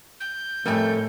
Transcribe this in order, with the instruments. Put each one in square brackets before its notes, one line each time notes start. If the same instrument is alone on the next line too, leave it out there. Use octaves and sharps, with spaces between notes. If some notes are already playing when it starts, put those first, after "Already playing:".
[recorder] G6
[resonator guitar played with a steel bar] F2 G3 A3 [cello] A2 [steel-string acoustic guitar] A#4 G5 G#5